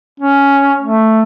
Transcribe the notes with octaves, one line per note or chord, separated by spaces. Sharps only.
C#4
A3